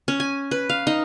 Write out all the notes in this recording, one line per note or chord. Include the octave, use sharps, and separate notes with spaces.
C#4
G#5
B4
F5
D#4